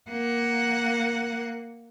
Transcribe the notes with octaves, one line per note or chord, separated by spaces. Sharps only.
A#3 F#5